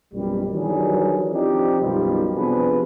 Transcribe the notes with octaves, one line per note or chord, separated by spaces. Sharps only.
A#1 F#2 B2 G3
D#3 E3 F#3 G3 D4 G#4
F3 C4 D4 D#4 G4
B1 F#2 B2 D#3 F3 G3
C3 F3 B3 D4 G#4 B4